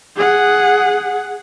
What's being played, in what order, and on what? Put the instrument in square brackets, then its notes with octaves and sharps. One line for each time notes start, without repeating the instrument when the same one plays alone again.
[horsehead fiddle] G#4 F#5